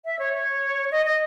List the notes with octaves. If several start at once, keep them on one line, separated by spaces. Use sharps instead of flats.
E5
C#5
C#5
D#5
D#5